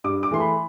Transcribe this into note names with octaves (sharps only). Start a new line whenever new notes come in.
G2 D6
D6
E3 A3 C6
B5